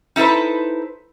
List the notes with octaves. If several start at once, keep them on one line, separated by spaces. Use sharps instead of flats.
D#4 E4 A4 B4 C5